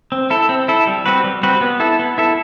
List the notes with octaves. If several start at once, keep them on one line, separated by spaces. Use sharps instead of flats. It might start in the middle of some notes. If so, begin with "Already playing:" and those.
C4
E4 A4
C4
E4 A4
G3
C4 F#4 B4
G3
C4 F#4 B4
B3
E4 A4
B3
E4 A4